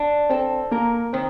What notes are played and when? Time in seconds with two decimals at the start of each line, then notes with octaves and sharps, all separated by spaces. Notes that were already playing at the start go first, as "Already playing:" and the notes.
Already playing: D4
0.29 C4 A4
0.71 A#3 A#4
1.13 D#3 C4